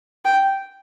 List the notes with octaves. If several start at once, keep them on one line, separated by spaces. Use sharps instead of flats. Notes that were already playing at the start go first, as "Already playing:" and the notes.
G5